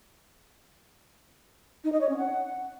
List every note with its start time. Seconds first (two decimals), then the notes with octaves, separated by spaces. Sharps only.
1.84 D#4
1.92 D#5
2.01 C#5
2.09 C#4
2.17 F#5